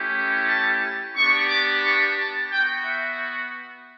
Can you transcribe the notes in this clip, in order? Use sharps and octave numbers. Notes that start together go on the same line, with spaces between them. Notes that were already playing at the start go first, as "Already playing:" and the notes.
Already playing: A3 C#4 E4 G4
A5
B3 D4 G4 C#6
D6
C#6
A5
B3 F#4 G5
E5